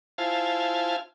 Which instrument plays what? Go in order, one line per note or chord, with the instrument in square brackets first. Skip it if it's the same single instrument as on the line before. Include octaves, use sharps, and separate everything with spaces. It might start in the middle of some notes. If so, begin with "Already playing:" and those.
[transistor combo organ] E4 F4 C5 F5 G#5 A5